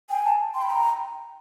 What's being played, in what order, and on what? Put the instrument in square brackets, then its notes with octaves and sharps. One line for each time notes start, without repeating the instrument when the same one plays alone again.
[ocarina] G5 [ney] G#5
[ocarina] A5
[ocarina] G5 [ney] C6
[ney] B5
[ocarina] G5 [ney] A#5